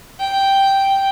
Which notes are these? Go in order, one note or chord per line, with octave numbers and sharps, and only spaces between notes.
G5